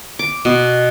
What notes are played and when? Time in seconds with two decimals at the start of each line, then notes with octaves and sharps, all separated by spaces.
0.19 D6
0.45 B2